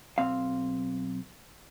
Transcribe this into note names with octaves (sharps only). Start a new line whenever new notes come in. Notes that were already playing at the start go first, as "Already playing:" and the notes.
B1 C4 F5